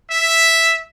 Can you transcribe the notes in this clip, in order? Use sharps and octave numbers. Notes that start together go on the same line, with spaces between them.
E5